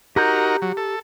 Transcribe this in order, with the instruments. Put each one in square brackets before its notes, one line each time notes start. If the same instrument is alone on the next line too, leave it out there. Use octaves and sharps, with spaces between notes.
[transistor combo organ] D#4 F#4 A#4 [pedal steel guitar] G4 A#5 G6
[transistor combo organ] F#3
A4